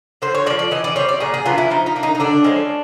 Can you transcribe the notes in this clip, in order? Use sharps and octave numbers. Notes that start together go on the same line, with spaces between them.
D3 C5
C#5
G#3 D5
F3
D5
E3 D#5
D5
G3 C4 C#5
D5
A#2 G#4
G#4
F#3 B3 D4 F4
E4
F3 D#4
D#4
A#3 D4
D#4
D#4
D3 D4
F3 G#3 C#4